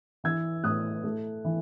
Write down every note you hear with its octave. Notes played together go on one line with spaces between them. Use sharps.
E3 E6 G#6
A2 D#6 F#6
A3
E3